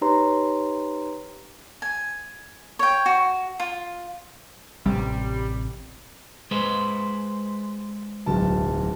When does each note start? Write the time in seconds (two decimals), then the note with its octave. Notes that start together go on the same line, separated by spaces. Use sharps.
0.01 D#4 G4 B4 C#5 A#5 C6
1.82 G#5
2.79 C#5 G5
3.06 F#4
3.60 F4
4.86 A1 C3 G3
6.51 G#3 B4 C5
8.26 D1 B1 A5